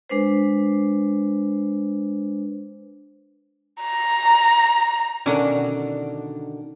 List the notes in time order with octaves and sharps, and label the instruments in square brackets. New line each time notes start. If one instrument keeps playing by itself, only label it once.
[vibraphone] G#3 D4 B4 C5
[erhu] A#5
[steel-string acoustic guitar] B2 D3 D#3 [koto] C#4 F#5 [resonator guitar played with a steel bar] D4 D5